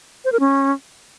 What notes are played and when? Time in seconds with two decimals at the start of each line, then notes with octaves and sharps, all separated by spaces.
0.25 C5
0.32 A#4
0.40 C#4